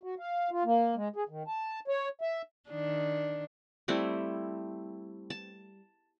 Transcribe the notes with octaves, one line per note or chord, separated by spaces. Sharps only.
F#4
F5
F4
A#3
G#3
G#4
D#3
A5
C#5
E5
D#3 D4
G3 A3 C4 E4
A5